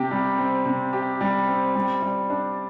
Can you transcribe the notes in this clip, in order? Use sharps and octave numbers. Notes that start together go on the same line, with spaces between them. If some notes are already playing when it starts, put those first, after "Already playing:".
Already playing: C3 G4
G3
C4
C3
G4
G3
C4
G3
G3
D4